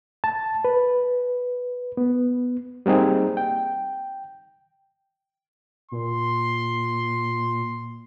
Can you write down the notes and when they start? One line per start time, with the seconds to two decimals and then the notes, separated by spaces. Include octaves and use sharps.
0.24 A5
0.65 B4
1.97 B3
2.86 G3 A#3 C4 D#4 G#4
3.37 G5
5.92 A#2 C6